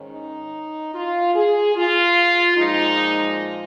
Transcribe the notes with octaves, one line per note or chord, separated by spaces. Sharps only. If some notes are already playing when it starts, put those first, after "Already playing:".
Already playing: G#2 D#3 C#4
D#4
F4
G#4
F4
A#2 F3 G#3 D#4